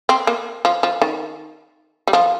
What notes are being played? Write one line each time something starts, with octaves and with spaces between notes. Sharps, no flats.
C4
A#3
F3
F3
D#3
G3
F3